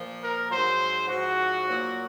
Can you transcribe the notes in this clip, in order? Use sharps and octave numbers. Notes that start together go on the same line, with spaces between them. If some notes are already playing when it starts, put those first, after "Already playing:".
Already playing: A#2 F3
A#4
G#2 F#3 C5
G#2 F3 F#4
A#2 F#3